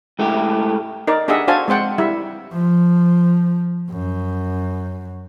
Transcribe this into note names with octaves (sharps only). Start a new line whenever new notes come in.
G#2 A3 E4 G4
D#4 A#4 D5
D4 G4 G#4 D#5 E5 F#5
D4 F#4 C5 F5 G#5 A5
G#3 C4 C5 F#5 G5
G3 E4 E5
F3
F#2